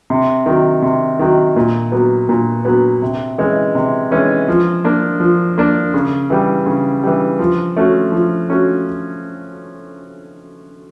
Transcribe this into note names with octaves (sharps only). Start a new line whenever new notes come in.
C3
D#3 F#3
C3
D#3 F#3
A#2
F#3 B3
A#2
F#3 B3
C3
E3 G#3 C#4
C3
E3 G#3 C#4
F3
A#3 D4
F3
A#3 D4
C#3
E3 G3
C#3
E3 G3
F3
A3 C#4 F#4
F3
A3 C#4 F#4